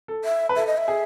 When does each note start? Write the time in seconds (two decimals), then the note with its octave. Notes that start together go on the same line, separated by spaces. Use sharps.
0.08 A4
0.24 E5
0.49 B4
0.56 A4 E5
0.67 D#5
0.77 E5
0.88 G#4